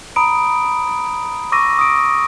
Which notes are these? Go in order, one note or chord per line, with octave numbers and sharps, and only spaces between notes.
A#5 B5 D#6 D7
C#6 D6 E6 A#6 D#7
D#6 D7